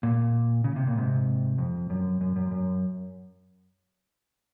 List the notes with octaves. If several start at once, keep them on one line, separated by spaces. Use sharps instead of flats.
A#2
C#3
C3
A#2
G#2 C3
F2
F#2
F#2
F#2
F#2